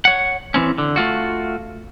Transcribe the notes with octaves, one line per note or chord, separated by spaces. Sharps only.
C#5 F#5
E3 C4 C#4
D3
A3 F4 F#4